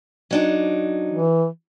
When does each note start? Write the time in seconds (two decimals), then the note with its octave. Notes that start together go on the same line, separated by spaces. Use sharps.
0.31 F#3 D4 D#4
1.12 E3